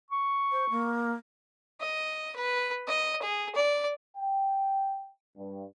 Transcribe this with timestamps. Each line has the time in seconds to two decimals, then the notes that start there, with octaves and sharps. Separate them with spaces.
0.10 C#6
0.52 C5
0.70 A#3
1.80 D#5
2.36 B4
2.87 D#5
3.22 G#4
3.55 D5
4.17 G5
5.37 G2